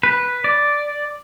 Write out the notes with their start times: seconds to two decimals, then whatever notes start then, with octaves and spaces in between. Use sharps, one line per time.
0.03 B4
0.44 D5